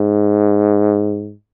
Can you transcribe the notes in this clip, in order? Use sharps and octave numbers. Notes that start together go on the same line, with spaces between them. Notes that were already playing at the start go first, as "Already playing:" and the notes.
Already playing: G#2